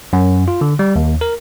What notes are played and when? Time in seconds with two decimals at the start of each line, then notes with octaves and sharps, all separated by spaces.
0.13 F#2
0.48 F4
0.61 D3
0.79 G3
0.96 D#2
1.21 A#4